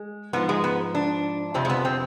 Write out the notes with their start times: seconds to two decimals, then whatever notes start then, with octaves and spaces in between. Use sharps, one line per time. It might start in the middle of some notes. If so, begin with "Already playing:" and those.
Already playing: G#3
0.33 G#2 F3 B3
0.49 G#3
0.64 B3
0.95 D4
1.54 F2 C3 F3 C4
1.65 G#3
1.70 B3
1.85 C4